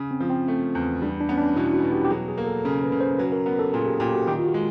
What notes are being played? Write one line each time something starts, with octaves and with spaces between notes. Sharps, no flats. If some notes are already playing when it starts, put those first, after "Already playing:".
Already playing: C#3
C4
F3
C4
A3
E2
G3 D4
D4
B3 C#4
D4
B2 E4
F#4
B2
G4
G4
F#3 G#4
G#4
A#3
A4
C#3 A#4
B4
C#3
C5
F#3 B4
A#4
B3 A#4
A4
A#2 G#4
G4
A#2 G4
F#4
D#3 G4
F4
F#4
G#3